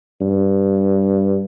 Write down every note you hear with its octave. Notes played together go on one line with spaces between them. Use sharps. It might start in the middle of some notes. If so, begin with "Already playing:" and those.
G2